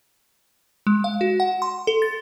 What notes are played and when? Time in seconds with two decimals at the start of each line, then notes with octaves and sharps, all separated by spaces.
0.87 G#3
1.04 F5
1.21 F#4
1.40 F#5
1.62 C6
1.87 A4
2.02 A6